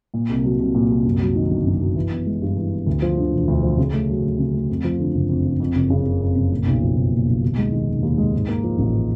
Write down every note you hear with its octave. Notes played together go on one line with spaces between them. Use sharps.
A#2
C2
F#3
C2
A#2
C2
F#2
F#3
D#3
G1
F#2
F#3
E3
B3
G#3
G2
E3
B3
D2
F3
D3
E1
D2
F3
C#3
A3
F#3
D2
C#3
A3
F2
F3
D3
F#1
F2
F3
F2
F#1
C#3
F#1
F2
F#1
A#2
B1
F3
B1
A#2
B1
D#2
G#3
D#3
F1
D#2
G#3
G#2
A#3
F3
A1